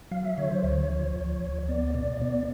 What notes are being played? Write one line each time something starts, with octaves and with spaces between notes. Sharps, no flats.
F#3 F5
E5
D3 C#5
C5
D2 C#5
F3
D2
D2
B3 D5
B2 D5
B3 D5